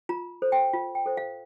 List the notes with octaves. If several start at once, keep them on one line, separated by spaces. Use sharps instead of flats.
F4 A#5
A4 C5
G5
F4 F5
G5
A4 C5
F5